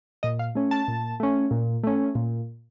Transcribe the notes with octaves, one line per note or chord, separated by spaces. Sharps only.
A#2 D#5
F5
A3 C#4
A5
A#2
A3 C#4
A#2
A3 C#4
A#2